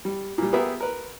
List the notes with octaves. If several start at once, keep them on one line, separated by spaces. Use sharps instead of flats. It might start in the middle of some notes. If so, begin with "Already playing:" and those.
G3
A#2 G3
B3 G4 G#4 A#4 B4 E5
A#4 B4